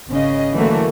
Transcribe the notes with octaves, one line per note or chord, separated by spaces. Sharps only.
G#1 C#3 D#5
D3 E3 F#3 A3 A#3 F#4